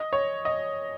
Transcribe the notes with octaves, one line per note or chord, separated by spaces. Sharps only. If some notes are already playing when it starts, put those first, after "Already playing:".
Already playing: D#5
C#5
D#5